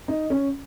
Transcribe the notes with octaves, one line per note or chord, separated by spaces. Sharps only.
D#4
C#4